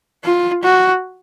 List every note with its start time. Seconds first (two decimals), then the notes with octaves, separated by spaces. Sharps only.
0.24 F4
0.63 F#4